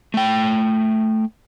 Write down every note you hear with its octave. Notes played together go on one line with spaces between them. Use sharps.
A3 G5